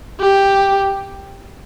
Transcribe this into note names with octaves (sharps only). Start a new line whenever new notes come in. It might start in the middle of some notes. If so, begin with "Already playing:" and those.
G4